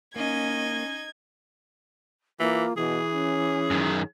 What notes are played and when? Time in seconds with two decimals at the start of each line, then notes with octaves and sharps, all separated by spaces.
0.16 A#3 C#4 D#4 D#5 G#6
2.40 E3 A#3 F4
2.77 B2 E3 G#4
3.13 C#4
3.71 F#2 D#3